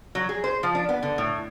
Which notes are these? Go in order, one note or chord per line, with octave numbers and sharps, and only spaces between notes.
F#3
G#4
C5
F3
D4
B3
D3
A2